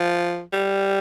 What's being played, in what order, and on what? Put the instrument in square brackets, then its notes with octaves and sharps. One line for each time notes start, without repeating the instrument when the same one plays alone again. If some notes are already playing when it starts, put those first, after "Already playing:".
Already playing: [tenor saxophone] F3
G3